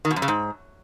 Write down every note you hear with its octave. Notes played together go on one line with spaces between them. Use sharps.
D#3
B2
F#2
C#3
G#2